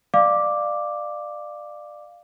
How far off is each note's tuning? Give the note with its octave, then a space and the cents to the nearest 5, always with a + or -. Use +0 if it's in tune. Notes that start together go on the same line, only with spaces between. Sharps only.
D5 +25 F5 +0 D6 +0